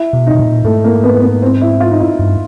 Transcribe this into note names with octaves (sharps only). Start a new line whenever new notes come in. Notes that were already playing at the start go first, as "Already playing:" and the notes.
Already playing: E4
B2
D#4
B2
A#2
G#2 A3
A#3
B3
B3
C4
E4
F4
D#4
E4
G2